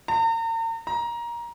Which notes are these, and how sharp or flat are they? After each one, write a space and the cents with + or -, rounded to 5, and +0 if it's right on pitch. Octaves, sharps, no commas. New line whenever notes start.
A#5 -40
A#5 +20